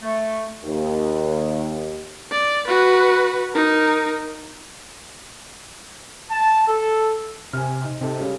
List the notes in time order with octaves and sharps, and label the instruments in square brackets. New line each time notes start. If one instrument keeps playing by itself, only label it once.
[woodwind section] A3
[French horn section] D#2
[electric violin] D5
F#4 B4
D#4 A#4
[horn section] A5
A4
[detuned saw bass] C3 [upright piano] G#5 F6
[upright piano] D#4
[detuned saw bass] C3 [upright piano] D#4 A4
[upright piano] C#3 G3 C#4